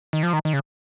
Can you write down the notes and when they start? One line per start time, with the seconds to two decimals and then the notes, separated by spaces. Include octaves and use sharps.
0.13 D#3
0.23 F3
0.33 D#3
0.45 D#3
0.53 C#3